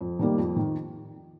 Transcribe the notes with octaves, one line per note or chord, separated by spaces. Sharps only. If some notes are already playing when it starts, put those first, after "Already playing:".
F2
D#3 G3 A#3
F2
D#3